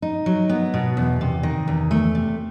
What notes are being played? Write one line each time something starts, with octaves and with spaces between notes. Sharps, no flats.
D#4
F#3
B3
B2
E2
C3
D#3
E2
A3
C3